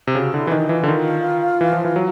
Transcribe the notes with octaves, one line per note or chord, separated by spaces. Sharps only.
C3
C#3 F#4
D3 E4
E3
D#3 D#4
E3 F4
D3
D#3
E3
F3
E3
F#3